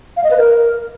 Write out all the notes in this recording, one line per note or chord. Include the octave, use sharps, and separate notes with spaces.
F5
D#5
B4
A#4